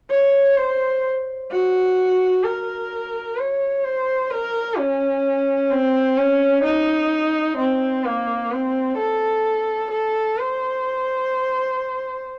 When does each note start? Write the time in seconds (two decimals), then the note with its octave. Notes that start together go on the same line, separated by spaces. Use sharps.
0.10 C#5
0.57 C5
1.51 F#4
2.44 A#4
3.38 C#5
3.85 C5
4.31 A#4
4.78 C#4
5.71 C4
6.17 C#4
6.64 D#4
7.57 C4
8.05 A#3
8.52 C4
8.98 A4
9.91 A4
10.38 C5